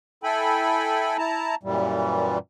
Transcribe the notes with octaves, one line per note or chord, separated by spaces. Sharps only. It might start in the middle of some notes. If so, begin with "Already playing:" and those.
E4 A4 G5 G#5 B5
E4 A5 A#5
F#2 A#2 E3 G3